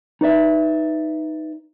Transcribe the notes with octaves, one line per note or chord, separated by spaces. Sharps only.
D#4 B4 D5 E5